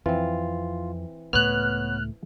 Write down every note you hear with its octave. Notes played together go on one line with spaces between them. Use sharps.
F2 E3 C4 F4
C#2 A2 A3 B3 B4 C#5 F6 F#6